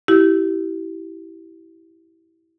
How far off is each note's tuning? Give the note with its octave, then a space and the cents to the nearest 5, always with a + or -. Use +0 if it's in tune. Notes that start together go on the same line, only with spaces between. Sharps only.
E4 -10 G4 -25